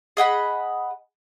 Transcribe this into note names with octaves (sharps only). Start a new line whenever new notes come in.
G#4 D#5 F#5 B5